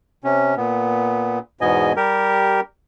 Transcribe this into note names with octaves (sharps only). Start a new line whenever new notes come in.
C3 C#4
A#2 B3
E2 G#2 B2 B3 D#5 G#5
G3 G4 A#4